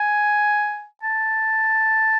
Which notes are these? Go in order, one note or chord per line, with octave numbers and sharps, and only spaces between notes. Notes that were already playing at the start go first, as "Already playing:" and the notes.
Already playing: G#5
A5